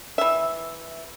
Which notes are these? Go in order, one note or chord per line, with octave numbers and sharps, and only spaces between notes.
E3 E5